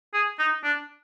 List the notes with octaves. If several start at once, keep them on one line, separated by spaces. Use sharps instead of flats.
G#4
D#4
D4